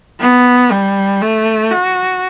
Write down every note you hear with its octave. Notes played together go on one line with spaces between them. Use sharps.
B3
G3
A3
F#4